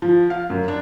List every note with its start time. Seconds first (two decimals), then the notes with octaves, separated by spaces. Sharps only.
0.02 F3
0.30 F5
0.50 F#2
0.68 D4